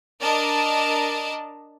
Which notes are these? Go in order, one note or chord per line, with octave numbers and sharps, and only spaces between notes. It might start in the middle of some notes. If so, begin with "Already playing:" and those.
D4 A#4 D5 D#5 A5 A#5